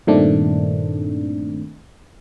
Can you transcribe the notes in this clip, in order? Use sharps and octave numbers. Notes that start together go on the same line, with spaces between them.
G2 A#2 D#3 A3 C4 D4